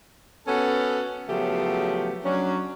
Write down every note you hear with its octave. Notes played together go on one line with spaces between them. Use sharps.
B3 C#4 F#4 A4
C#3 F3 F#3 A3 B3 G4
F#3 C#4 D4